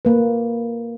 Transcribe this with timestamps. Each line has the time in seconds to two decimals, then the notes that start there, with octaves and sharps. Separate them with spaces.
0.05 A#3 B4